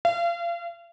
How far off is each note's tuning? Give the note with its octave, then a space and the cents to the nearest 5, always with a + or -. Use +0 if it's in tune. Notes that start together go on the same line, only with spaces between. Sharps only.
F5 -35